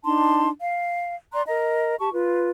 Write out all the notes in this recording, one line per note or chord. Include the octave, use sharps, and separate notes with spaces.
D4 D#4 A5 C6
F5
D5 A#5 C6 F#6
A#4 D#5 A#5
G4 A5 C#6
F4 B4